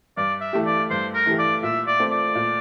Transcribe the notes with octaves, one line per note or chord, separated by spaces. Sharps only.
G2 D5
E5
E3 A3 E4 G4
D5
G2 C5
A#4
E3 A3 E4 G4
D5
A#2 E5
D5
A3 C4
D5
A#2